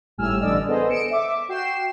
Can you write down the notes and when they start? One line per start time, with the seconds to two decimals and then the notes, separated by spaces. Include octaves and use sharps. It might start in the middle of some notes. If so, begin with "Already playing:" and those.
0.18 G#1 A2 G3 G#5 E6 F6
0.39 A1 D3 D5 D#5 E6
0.68 B3 G#4 A4 C5 D#5
0.90 C#7 D7 E7
1.10 E5 D6
1.49 F#4 G5 C7 E7